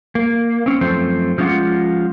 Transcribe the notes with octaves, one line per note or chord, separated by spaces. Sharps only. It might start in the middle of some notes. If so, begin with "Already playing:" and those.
A#3
C4 C#4
F#2 F3 A3 C4 C5
F3 G#3 C#4 F4 G4 F#5